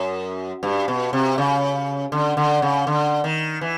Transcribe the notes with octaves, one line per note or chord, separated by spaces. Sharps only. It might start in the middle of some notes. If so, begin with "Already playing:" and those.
Already playing: F#2
G2
B2
C3
C#3
D3
D3
C#3
D3
D#3
E3